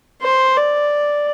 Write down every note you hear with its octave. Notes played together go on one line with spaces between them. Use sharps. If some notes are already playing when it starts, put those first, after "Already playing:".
C5
D5